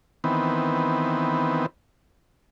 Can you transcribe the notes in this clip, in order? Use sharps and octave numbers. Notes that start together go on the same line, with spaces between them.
D#3 E3 B3 C4